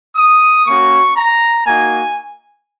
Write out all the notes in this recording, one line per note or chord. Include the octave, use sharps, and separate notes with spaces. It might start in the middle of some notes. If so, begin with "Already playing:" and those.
D#6
A#3 C#4 F#4 C#6
A#5
A#3 D#4 F#4 G#5